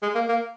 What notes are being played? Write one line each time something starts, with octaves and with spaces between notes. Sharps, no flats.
G#3
A#3
A#3